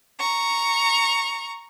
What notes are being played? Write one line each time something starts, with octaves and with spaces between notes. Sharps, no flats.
A#5 C#6